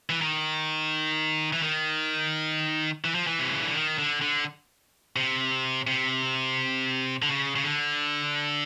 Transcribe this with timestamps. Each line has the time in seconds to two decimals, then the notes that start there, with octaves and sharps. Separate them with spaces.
0.10 E3
0.21 D#3
1.53 E3
1.62 D#3
3.05 E3
3.15 F3
3.27 E3
3.39 C3
3.51 C#3
3.63 D3
3.74 D#3
3.98 D3
4.21 D3
5.16 C3
5.87 C3
7.22 D3
7.29 C#3
7.56 C#3
7.64 D3